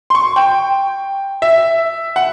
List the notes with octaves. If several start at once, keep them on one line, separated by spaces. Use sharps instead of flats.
C6
C#6
G5
E5
F#5